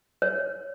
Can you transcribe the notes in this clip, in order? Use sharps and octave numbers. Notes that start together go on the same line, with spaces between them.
C#5